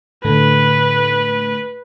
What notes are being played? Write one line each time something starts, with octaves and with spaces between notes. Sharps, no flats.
A2 D3 A3 B4